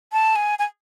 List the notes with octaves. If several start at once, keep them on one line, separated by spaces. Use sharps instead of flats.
A5
G#5
G#5